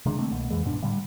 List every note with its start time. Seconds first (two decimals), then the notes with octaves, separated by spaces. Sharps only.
0.06 C3 D#3 G#3 D4
0.18 D#3 A3 A#3 C4
0.31 C2 B2 A#3
0.51 F2 E3 G#3
0.64 D1 G#2 B2 D4
0.82 A2 D3 G3